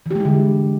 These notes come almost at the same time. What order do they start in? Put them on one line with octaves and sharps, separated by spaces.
E3 G4 G#3 E4 D3